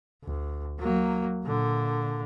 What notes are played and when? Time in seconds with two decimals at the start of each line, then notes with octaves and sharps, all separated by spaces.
0.24 D2
0.79 F#3 A#3
1.44 A#2 D3